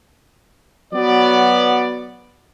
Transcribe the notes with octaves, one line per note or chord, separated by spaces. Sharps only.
F#3 B3 D5